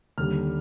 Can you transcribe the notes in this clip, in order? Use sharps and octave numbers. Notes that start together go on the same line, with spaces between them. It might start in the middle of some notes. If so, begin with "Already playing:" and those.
D#2 D3 G3 F6